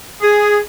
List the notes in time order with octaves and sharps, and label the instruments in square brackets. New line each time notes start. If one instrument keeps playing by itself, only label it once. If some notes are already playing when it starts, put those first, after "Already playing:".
[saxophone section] G#4